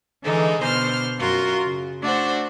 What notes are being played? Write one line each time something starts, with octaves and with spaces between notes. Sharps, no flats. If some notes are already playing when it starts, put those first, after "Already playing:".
D3 E3 G#3 D#4 A4
B2 D3 C5 C6 F6
F#2 F4 F#4 A#4 C6
C#3
A3 D4 F#4 C5